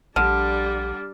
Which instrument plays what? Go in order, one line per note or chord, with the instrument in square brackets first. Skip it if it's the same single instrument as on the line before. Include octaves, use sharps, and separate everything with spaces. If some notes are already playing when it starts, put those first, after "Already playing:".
[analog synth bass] A#1 [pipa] D3 [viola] G3 D4 [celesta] F6